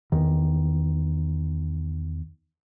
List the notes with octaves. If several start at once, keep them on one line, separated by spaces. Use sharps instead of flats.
E2 D#3